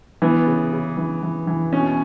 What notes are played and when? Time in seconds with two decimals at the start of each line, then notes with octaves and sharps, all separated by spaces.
0.22 E3 B3
0.47 C#3
0.72 C#3
0.97 E3
1.22 E3
1.47 E3
1.73 B2 C#4